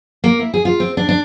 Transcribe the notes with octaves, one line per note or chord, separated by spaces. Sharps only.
A#3
E4
G#4
F4
C4
D4
D4